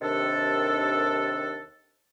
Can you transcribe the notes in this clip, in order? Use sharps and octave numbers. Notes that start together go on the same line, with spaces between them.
D#2 C3 D#3 D4 A4